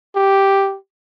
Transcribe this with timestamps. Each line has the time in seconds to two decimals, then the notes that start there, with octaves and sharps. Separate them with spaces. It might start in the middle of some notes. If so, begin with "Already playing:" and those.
0.15 G4